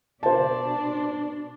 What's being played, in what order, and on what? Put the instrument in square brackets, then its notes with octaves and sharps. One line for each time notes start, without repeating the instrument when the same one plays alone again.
[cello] B2 D4 [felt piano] C5 A5